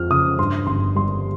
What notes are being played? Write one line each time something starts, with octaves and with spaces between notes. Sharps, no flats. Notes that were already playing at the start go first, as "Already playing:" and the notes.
Already playing: F2 F3 F6
C#3 D#6
G2 C6
G1 C6
G3 C6